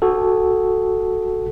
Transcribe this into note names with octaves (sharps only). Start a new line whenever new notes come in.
F#4 A4